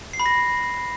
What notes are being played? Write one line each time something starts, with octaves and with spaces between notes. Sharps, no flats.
C7
B5
A#6